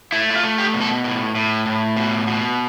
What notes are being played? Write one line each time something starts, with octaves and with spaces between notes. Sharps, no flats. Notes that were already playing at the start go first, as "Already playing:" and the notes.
A3 E4
E4
F4
A3
G4
B2
A4
A2
A2
A2
B2
B2